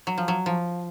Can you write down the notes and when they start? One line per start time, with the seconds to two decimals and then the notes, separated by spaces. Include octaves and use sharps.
0.07 F#3
0.18 F3
0.28 F#3
0.46 F3